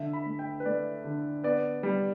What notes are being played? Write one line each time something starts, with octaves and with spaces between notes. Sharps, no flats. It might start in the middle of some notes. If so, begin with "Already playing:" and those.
Already playing: D3 E5
B5
A3
G5
B4
A3 D5
D3
B3 D5
G3